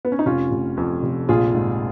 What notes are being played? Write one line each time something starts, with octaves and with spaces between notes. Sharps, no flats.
B3
C#4
D#4
F1 C#4 F4
F1
F2
F1
A#1 F4 G#4
G#2